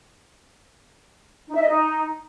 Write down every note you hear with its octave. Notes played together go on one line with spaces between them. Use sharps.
D#4
E5
D#5
D#4